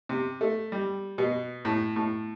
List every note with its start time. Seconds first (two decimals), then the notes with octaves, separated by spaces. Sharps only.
0.09 C3
0.41 A3
0.72 G3
1.18 B2
1.65 A2
1.96 A2